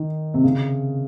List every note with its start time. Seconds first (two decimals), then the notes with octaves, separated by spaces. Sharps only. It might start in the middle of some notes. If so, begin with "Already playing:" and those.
Already playing: D#3
0.34 C3
0.44 C#3